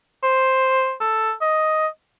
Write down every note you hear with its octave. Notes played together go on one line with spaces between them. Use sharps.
C5
A4
D#5